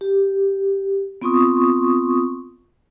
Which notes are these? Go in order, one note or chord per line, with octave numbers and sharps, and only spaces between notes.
G4
B3 C4 F4 C6 C#6 D#6